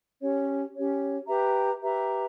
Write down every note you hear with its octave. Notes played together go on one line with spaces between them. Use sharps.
C#4 G4 C#5
C#4 G4 C#5
G4 B4 E5 A#5
G4 B4 E5 A#5